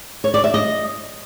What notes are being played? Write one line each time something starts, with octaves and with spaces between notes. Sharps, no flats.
C#5
D5
E5
D#5